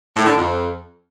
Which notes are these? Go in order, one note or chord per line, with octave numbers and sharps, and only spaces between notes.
A2
D3
F2